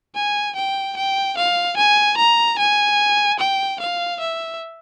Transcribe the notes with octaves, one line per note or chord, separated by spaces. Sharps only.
G#5
G5
G5
F5
G#5
A#5
G#5
G5
F5
E5